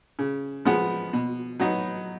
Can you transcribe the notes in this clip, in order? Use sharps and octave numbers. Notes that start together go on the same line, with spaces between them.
C#3
F3 G#3 B3
B2
F#3 B3 D#4